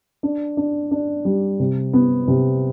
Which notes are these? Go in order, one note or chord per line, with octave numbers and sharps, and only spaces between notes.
D4
D4
D4
G3
C3
B3
C3